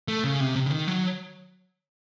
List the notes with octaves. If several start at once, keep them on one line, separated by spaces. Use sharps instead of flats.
A3
C#3
C3
C3
C#3
D#3
F#3